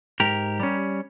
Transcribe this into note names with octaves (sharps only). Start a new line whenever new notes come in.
G#2 G4 A#4
G3 C#4